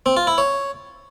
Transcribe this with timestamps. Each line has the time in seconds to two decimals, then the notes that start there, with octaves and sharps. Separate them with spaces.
0.06 C4
0.17 F4
0.27 E4
0.38 C#5